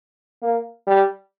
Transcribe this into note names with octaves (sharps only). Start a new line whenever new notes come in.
A#3
G3